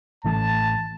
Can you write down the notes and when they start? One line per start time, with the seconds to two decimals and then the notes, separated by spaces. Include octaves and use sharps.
0.24 A1 E3 A3 A5